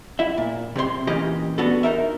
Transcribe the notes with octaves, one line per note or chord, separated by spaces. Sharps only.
E4 E5
A#2
C3 C4 C#5 C6
A#2 E3 C#4 G4 D#5
B3 D4 F#4 A4
D#4 A#4 E5